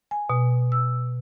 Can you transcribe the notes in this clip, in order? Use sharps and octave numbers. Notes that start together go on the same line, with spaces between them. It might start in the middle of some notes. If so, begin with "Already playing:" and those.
G#5
B2
E6